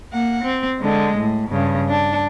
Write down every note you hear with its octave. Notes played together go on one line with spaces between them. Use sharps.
A#3 F#5
C4
D3 G#3
A2
G2 C#3
D4